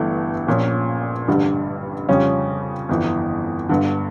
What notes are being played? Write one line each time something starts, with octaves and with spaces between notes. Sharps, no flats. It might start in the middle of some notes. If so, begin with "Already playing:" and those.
Already playing: G1 G2 E3 A3
A#1 A#2 F3 C#4
A1 G2 D3 G3
F2 C#3 G3 C#4 F4
G1 F2 E3
G1 G2 D3